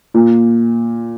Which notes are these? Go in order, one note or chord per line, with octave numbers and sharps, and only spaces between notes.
A#2